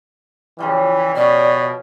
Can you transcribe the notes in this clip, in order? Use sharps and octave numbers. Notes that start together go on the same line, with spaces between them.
C#3 E3 F3 G3
B2 C#4 D5